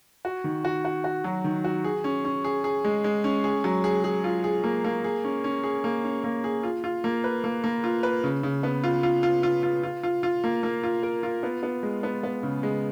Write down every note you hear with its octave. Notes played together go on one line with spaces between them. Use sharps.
F#4
D#3
F#4
F#4
F#4
F#3
D#3
F#4
G#4
C#4
C#4
G#4
G#4
G#3
G#3
C#4
G#4
F#3
G#4
G#4
F4
G#4
A#3
A#3
G#4
C#4
C#4
G#4
A#3
C#4
A#3
G#4
F4
F4
A#3
B4
A#3
A#3
F4
B4
C#3
C#3
B3
F4
F4
F4
F4
F4
F4
F4
F4
A#3
A#3
F4
A#4
F4
B3
B3
G#3
B3
B3
C#3
G#3